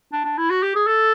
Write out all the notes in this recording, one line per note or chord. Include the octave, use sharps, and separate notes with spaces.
D4
D4
E4
F#4
G4
G#4
A4